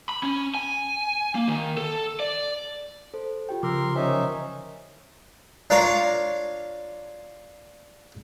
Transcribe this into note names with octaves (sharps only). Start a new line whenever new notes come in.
B5
C#4
G#5
A#3
D#3
A4
D5
A4 C5
F4 G4 G5
C#3 F3 A#4 C6 D6 E6
C#4 D#4 A#4 C5 E5 G#5
D4 F4 A#4 C#5 F5 A#5